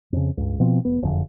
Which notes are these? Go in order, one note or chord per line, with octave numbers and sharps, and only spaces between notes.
F2 C#3
C#2 G2
B2 F3 C4
F1 B3
F#1 F2 D3